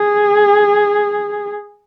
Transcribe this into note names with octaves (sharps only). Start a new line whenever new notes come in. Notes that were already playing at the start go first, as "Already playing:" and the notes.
Already playing: G#4